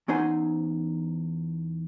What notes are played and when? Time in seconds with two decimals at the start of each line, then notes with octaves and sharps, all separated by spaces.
0.08 E2 C#4 D#4 C5 F#5 G#5